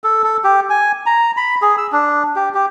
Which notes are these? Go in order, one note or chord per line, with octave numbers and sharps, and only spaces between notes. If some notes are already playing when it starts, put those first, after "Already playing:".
A4
A4
G4
G#5
A#5
B5
G#4
E6
D4
G4
G4